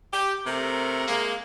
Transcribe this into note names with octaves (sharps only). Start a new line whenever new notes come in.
G4
C3 A3 A#4
G#3 A#3